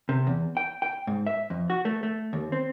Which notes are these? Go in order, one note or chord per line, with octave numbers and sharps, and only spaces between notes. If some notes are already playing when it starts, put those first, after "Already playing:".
C3
E2
G5
G5
G#2
E5
F2
F#4
A3
A3
D#2
C4